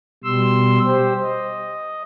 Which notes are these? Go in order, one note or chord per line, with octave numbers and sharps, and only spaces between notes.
B2 G3 C6 E6
G4 C5
D#5